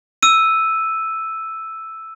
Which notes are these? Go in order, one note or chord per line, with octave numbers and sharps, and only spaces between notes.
E6 D#7